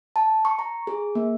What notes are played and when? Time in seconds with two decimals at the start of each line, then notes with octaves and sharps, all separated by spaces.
0.16 A5
0.45 C#6
0.59 A#5
0.87 G#4
1.15 A#3